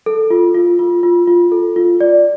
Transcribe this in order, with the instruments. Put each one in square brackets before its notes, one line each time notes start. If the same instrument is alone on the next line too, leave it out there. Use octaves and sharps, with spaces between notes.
[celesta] A4
F4
F4
F4
F4
F4
A4
F4
D5